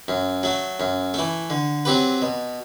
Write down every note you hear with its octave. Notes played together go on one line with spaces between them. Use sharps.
F#2
F#3 A3
F#2
E3 A3
D3
F#3 C4 G4 B4
B2